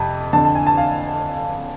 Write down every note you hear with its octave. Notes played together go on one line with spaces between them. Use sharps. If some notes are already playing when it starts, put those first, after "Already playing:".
Already playing: F2 C3 A5
F2 D3 A5
A5
G#5
A5
F5